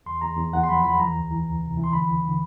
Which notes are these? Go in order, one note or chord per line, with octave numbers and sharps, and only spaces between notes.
E2 C6
E2 A#5
E2
E2 F#5
C6
F3 B5
E2 B5
E3 A#5
D2
E3
D2
C3
E3
C6
D3 B5
D#2
D3